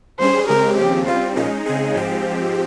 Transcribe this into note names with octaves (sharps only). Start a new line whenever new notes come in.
G2 G3 C#4 G#4 C5
C#3 G#3 C4 G4 A#4
D#2 C#3 F3 C4 G4
C#3 G3 C4 F4
A#2 F3 G#3 C#4 D#4
C#3 G#3 C4 D#4 G#4
G#2 F3 G#3 C4 G4